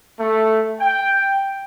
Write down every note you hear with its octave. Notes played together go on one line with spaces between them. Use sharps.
A3
G5